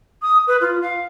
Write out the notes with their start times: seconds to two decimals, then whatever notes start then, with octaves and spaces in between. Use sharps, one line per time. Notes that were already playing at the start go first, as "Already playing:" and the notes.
0.22 D#6
0.47 B4
0.61 F4
0.81 F5